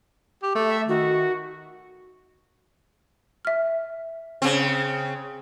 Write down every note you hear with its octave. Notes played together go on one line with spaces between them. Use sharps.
G4
A3
E5
D#3 F#4
E5 F6
C#3 C4